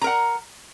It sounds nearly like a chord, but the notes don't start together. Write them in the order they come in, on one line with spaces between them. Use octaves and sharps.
A#5 A#4 F#5